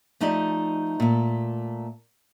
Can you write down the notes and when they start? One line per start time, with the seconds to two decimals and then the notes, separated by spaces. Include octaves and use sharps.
0.20 F3 A3 D#4 G4 D5 D#5
1.00 A#2 A3